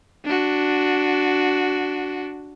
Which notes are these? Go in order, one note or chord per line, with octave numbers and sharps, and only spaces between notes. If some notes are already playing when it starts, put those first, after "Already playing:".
D4 F#4